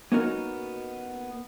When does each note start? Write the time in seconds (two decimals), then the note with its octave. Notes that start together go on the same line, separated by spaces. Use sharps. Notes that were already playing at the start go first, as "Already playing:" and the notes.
0.12 A#3 B3 C#4 D#4 F#4 A#4